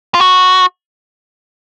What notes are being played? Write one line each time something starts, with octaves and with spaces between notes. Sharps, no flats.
F4
F#4